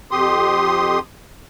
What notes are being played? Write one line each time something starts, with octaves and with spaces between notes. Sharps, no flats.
F2 G4 C6 D#6